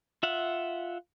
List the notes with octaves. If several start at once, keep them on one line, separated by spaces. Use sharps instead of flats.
F4 E5 F#5